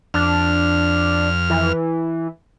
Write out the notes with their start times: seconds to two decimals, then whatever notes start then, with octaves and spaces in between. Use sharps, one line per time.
0.14 F2 D4 F6
1.50 E3